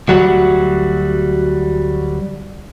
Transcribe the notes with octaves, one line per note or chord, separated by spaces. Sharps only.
D2 F#3 G3 F#4